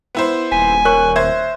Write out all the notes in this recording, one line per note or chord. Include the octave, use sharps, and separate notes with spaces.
B3 E4 C5
D#1 G#5 B6
A#4 C#5 C#6 F#6
C5 E5 G#6